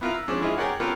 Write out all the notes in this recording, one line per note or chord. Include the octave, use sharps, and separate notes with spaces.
B3 E4 F4 A#4 F5 A#5
E6
F3 G#3 C#4 D4 C5
E3 G#3 E4 F4 D#5
G4 G#4 A#4 C#5 D5 F#5
B3 C#4 F4 G4 A4 A#4